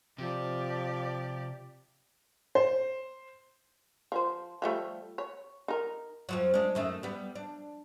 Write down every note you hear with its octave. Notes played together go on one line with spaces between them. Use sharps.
C3 F3 G4 D5
C5
F3 C5
F3 G3 A3
C#5
D#4 A#4
F2 F3 F#3
G#3 D4
F#2 D#3 A3
G3 B3
D4